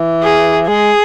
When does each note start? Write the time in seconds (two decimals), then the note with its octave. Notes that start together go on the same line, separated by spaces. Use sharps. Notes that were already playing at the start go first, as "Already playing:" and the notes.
Already playing: E3
0.23 G#4
0.68 G#3 G#4